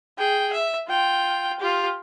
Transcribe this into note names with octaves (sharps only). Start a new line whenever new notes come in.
G#4 G5
E5
F4 G5
F4 G4